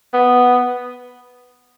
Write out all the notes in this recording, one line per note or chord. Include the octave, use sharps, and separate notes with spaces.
B3